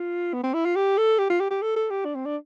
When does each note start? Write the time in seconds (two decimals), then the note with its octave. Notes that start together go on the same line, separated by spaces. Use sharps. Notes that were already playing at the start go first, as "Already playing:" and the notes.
Already playing: F4
0.33 B3
0.44 C4
0.54 E4
0.65 F4
0.76 G4
0.97 A4
1.18 G4
1.30 F4
1.40 G4
1.50 G4
1.62 A4
1.76 A4
1.90 G4
2.05 D4
2.15 C4
2.25 D4